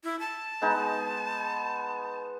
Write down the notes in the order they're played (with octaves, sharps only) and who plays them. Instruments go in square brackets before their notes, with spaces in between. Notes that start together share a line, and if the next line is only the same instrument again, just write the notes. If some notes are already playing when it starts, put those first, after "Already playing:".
[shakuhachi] E4
A5
[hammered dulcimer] G#3 B3 D#4